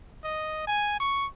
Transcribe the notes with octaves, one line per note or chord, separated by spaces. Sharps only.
D#5
G#5
C#6